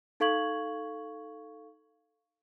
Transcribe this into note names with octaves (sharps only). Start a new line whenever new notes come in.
D#4 A4 F5 C#6 G#6 F#7